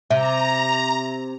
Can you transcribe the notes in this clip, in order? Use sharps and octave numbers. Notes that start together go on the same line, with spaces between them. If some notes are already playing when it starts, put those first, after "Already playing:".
C3 E5 A#5